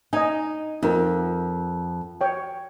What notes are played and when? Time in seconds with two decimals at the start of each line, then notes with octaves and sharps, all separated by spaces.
0.13 D#4 D#5 G#5
0.83 F2 D#4 A#4
2.21 C#5 G5